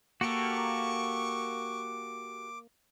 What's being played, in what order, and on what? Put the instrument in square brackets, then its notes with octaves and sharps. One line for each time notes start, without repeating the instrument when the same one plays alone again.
[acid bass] A#3 [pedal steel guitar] F#4 G4 A4 [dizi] C#6 [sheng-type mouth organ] D6